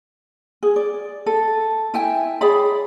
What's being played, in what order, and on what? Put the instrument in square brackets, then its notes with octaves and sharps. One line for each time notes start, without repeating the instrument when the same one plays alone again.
[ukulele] G#4
D5
A4
E4 G5 G#5
G#4 C#5 D5 B5